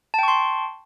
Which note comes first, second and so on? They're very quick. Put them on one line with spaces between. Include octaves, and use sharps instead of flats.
A5 G5 C#6 C6